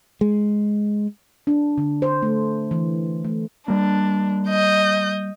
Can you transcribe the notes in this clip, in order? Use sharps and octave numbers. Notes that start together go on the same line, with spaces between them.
G#3
D4
D3
C5
A3
E3
A3
G3 A#3 D4
D#5 G6